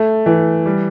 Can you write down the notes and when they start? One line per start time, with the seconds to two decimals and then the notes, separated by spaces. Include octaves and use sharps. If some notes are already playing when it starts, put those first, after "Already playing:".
Already playing: A3
0.26 E3
0.66 G3